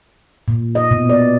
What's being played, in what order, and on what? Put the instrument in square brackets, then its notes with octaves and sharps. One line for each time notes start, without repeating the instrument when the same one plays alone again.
[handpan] A#2
D#5
B2
D5